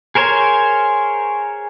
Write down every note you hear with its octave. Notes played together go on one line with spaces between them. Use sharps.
G#4 A#4 C5 C#5 G#5